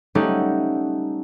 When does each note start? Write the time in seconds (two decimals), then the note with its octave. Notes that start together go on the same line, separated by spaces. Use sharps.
0.15 G3 A3 C#4 D#4 G4 F#5